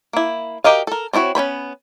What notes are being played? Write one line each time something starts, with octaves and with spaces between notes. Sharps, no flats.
A#3 E4
F#4 G4 A#4 D#5 F5
A4 A#4
C4 D4 E4 F#4 C#5
B3 C#4 C5 B5